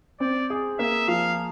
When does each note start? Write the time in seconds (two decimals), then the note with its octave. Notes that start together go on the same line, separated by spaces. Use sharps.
0.20 C4 D5
0.50 G#4
0.79 A#3 E5
1.08 F3 F5